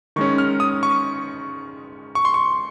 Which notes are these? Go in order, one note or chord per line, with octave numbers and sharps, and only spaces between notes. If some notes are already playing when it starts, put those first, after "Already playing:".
D#3 G#3 C#4 C#6
F6
D#6
C#6
C#6
C6
C#6